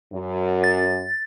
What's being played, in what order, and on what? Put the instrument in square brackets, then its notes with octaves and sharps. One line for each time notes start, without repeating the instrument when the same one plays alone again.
[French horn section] F#2
[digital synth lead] A6